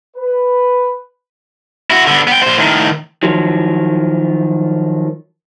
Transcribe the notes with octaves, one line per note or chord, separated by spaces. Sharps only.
B4
E4 F#4
D3 B3
B3 G5
A#2 C5
A2 D#3
D#3 F3 F#3